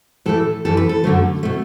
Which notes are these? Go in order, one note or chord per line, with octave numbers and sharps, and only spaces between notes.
A2 E3 A3 A4
F#2 E3 G3 A4
B4
A4
F#2 D3 F#3 A3
B2 A3